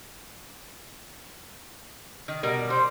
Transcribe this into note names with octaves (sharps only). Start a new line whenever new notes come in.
D#3
B2 G3 A#4
G3 C5